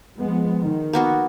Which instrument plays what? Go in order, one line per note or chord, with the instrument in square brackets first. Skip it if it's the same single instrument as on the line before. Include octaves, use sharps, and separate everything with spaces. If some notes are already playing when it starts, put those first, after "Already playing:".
[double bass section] F3 G#3 B3
D#3
[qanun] A#3 B3 F#4